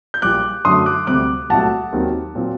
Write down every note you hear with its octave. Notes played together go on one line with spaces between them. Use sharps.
G6
A#1 A#2 G3 D6 F#6
F#2 D3 F#3 A3 C6 D#6
D6 F#6
D2 C3 G3 C4 D6 F#6
C2 A#2 F#3 A3 F#5 A5
D#2 D#3 F#3 C4
A#2 F#3 C4